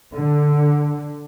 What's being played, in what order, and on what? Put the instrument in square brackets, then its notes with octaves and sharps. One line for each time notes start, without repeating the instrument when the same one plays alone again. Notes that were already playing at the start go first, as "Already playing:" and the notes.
[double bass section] D3